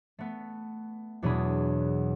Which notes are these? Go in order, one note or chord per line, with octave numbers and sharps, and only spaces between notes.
A3 B3
E2 B2 F#3 D4 G#4 B5